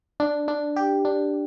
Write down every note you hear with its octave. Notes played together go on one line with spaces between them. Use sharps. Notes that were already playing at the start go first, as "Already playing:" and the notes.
D4
D4
G4
D4